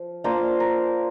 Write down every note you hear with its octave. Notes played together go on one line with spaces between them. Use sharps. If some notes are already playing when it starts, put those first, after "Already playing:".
Already playing: F3
A#3 D4 F4 C5
A#4